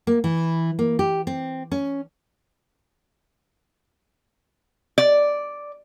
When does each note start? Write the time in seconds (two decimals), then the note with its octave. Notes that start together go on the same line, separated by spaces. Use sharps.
0.07 A#3
0.24 E3
0.79 A#3
0.99 G4
1.27 C4
1.72 C#4
4.98 D5